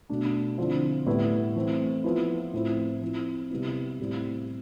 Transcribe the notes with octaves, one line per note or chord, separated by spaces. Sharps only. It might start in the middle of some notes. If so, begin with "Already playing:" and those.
B2 A3 D4
D3 F3 C4 E4
A2 G3 B3 E4
E3 A3 C4
F3 B3 E4
A2 F3 C4 E4
F3 C4 E4
C3 G3 B3 E4
A2 G3 C4 E4